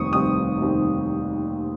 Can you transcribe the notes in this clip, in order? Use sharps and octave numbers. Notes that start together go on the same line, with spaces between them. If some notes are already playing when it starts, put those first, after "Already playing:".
Already playing: F1 D#2 D#3 G3 C4 C#6 D#6
F1 D#2 D#3 G3 C4 D#6
F1 D#2 D#3 G3 C4